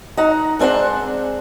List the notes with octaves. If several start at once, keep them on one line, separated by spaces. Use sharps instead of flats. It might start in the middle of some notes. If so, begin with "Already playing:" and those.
D#4 F#5 A#5
G#3 C4 D4 C5 F#5